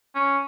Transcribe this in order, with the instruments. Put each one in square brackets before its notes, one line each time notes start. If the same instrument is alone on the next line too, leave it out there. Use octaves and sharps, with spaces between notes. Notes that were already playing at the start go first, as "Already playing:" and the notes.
[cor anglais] C#4